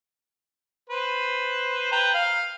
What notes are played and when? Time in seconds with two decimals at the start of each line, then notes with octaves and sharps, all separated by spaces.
0.90 B4 C5
1.92 B4 G5 A#5
2.14 F5